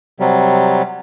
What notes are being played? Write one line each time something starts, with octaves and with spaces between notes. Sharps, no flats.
C3 F#3 G3